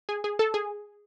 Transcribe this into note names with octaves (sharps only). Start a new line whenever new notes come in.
G#4
G#4
A4
G#4